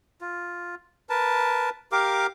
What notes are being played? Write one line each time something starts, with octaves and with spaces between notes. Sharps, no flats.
F4
A#4 B4 A5
G4 A#4 F5 D6